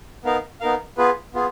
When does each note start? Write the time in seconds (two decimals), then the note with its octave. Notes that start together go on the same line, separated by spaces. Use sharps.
0.25 B3 D#4 A#4 F5
0.61 B3 D#4 A#4 F5
0.97 B3 F4 G#4 B4
1.34 B3 F4 G#4